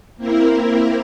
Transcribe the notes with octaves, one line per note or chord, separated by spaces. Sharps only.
A#3 C4 E4 A#4